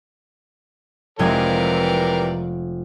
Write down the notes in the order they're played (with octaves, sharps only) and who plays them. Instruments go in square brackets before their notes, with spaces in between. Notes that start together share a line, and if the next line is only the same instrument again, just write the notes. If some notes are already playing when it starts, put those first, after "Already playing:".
[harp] F1 G#3 G#6 [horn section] C3 E3 [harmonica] A#4 D5